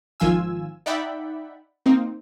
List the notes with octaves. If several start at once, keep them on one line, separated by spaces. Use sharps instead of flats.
G#1 D#3 F3 F4 G#5 E6
D#4 D5 E5 F#5 G5 B5
A#3 C4 D#4